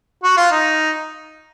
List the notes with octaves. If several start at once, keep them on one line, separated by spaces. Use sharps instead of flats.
F#4
F4
D#4